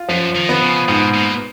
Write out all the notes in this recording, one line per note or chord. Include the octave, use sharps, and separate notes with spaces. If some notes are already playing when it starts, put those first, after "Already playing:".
Already playing: F4
F#2 F3
D#3
B3
D#3
C#3
G#2 B2
A#2